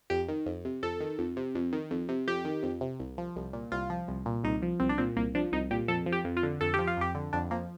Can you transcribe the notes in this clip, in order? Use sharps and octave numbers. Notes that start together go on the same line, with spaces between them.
F2 G4
D#3
F2
C3
F2 A4
D#3
F2
C3
F2
D#3
F2
C3
F2 G4
D#3
F2
C3
C2
F3
C2
A#2
C2 F4
F3
C2
A#2
C2 D#4
F3
C2 C4
D4
A#2 C4
C2 A#3
F3 D4
C2 D#4
A#2 G4
F2 A4
F3
G4
F2
F4
D3
F2 A4
F3 G4
F4
F2 G4
D3
F2 D4
F3 A#3